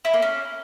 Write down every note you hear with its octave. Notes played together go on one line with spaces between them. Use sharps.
E4
A#3
C#4